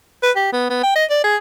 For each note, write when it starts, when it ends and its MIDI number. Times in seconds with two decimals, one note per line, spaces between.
0.23 0.31 71
0.36 0.50 67
0.53 0.67 59
0.70 0.80 59
0.83 0.95 79
0.96 1.05 75
1.11 1.24 74
1.24 1.37 68